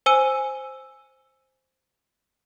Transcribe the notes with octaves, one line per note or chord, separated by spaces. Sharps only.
C5 G#5 E6 D#7